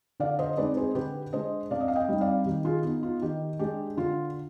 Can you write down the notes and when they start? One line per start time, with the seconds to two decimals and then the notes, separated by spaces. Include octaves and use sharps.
0.20 D3 D5 F5
0.39 C5 D#5
0.57 G#3 C4 D#4 B4 D5
0.77 G#4 C5
0.95 D3 G4 B4
1.33 G#3 D4 C5 D#5
1.71 C3 D5 F5
1.81 D#5
1.88 F5
1.95 D#5 G5
2.08 G3 C4 D#4
2.21 D5 F5
2.46 D#3 G4
2.65 F4 G#4
2.84 B3 D#4
3.03 F4
3.22 D#3 G4
3.59 G#3 D4 G4
3.97 D3 F4